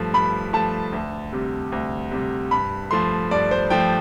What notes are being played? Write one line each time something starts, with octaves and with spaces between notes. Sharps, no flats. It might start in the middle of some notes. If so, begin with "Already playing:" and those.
Already playing: G2 F3 A3
G2 B5
F3 A3 A5
D2
C3 G3
D2
C3 G3
G2 B5
F3 A3 C6
G2 D5
C5
F3 A3 G5